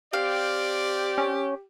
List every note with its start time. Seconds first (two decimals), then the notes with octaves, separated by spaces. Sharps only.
0.13 C4 G4 D5 F5
1.18 C#4